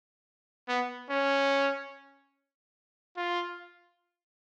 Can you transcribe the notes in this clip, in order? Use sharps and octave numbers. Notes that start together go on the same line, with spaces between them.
B3
C#4
F4